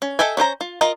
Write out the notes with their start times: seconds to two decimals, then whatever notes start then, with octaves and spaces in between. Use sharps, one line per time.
0.02 C#4
0.19 A4 D#5 E5 G5 G#5
0.37 C#4 D4 C5 A#5
0.61 F4
0.81 F4 A#4 D#5